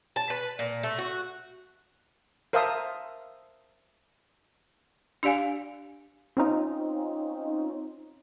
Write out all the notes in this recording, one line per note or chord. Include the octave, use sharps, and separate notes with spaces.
A5
B4
A#2
A3
F#4
A#4 C5 E5 F5 A5 D#6
D4 G4 D5 F5 G#5
C4 C#4 D#4 F4